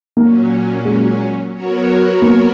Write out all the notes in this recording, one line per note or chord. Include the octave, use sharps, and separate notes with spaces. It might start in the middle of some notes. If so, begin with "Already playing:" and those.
A#2 F#3 A#3 C#4
G#3
F#3 B3 F#4 A#4 C#5
A#3